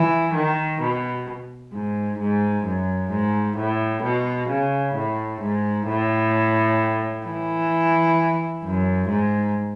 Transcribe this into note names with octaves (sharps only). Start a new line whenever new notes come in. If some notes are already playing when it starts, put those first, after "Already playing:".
Already playing: E3
D#3
B2
G#2
G#2
F#2
G#2
A2
B2
C#3
A2
G#2
A2
E3
F#2
G#2